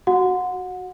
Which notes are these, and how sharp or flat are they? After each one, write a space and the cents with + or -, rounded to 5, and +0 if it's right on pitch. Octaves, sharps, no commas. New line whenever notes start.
F#4 +5 F#5 -30